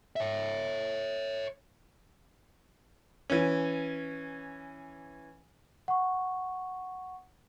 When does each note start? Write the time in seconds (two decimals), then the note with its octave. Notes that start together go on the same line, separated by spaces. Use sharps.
0.16 C#5 E5
3.30 E3 C#4
5.88 F#5 C#6